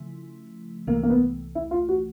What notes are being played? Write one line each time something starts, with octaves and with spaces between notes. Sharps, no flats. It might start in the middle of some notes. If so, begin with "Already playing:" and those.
Already playing: C#3 F3 A3 E4
C2 C3 E3 A3 A#3
A#3
B3
E4
F4
F#4